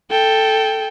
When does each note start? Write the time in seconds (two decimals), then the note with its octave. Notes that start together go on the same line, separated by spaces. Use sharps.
0.11 A4 G5